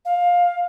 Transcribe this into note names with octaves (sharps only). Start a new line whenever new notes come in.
F5